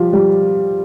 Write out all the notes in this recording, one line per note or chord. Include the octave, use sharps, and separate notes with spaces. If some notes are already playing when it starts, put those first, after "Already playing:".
Already playing: F3 G3 F4 G4
G3 G4